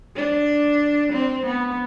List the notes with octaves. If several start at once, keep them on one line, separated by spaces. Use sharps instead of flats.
D4
C4
B3